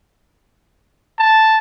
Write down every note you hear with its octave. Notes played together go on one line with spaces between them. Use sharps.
A5